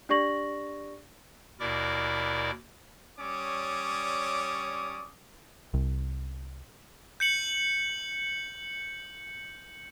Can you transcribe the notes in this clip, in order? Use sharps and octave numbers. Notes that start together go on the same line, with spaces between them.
D4 G4 D5 C#6 A#6 F#7
D#2 B2 E4 A#4 D5 D6
G3 C#4 C#5 D5 D6 D#6
C2
G6 C#7 F#7